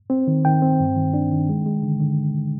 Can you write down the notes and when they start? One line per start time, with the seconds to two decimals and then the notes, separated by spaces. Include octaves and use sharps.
0.10 C4
0.27 D#3
0.45 D#3 G5
0.62 C4
0.80 G2
0.96 D#3
1.14 D4
1.31 D#3
1.49 G#3
1.66 G#3
1.83 D3
2.00 D3